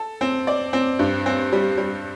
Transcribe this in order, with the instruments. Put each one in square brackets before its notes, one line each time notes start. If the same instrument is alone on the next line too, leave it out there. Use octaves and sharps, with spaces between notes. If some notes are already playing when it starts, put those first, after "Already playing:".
Already playing: [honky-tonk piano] A4
C4
D5
C4
G2
C4
G3
G3